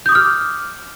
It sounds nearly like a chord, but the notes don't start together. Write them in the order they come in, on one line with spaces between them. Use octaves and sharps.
G6 D#6 D6 F6